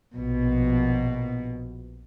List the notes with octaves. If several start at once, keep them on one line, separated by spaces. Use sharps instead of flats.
A#1 B2